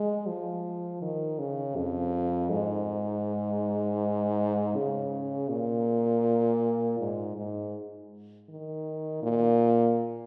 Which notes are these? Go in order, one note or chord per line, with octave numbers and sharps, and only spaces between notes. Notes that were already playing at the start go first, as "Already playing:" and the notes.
Already playing: G#3
F3
D#3
C#3
F2
G#2
C#3
A#2
G#2
G#2
D#3
A#2